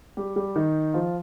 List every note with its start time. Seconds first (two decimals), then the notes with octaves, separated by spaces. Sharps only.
0.17 G3 G4
0.36 G3 G4
0.56 D#3 D#4
0.94 F3 F4